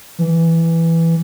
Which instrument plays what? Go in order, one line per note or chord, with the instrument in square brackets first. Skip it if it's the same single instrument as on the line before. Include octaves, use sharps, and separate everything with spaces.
[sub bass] E3